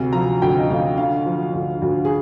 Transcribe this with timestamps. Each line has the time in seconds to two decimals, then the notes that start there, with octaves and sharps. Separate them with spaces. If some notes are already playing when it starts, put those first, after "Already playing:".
Already playing: D2 C3
0.13 F3 A#5
0.42 D2 G5
0.57 D#5
0.70 D2 F5
0.98 D3 F5
1.26 F3
1.54 D2
1.82 D2
2.05 G#4